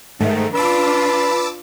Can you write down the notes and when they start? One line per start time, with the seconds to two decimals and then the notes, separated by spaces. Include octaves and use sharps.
0.20 G#2 D#3 A3
0.55 D4 F4 B4 A5 D6 E6